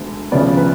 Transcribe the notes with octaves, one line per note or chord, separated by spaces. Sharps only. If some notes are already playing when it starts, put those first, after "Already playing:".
Already playing: D2 D3 G#3 B3
D2 C#3 F3 B3 D5
B4